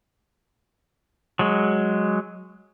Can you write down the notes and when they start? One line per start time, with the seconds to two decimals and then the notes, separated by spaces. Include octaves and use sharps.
1.39 F#3 G#3